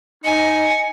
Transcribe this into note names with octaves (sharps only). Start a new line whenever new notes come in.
D#4 D#5 G#5 C#7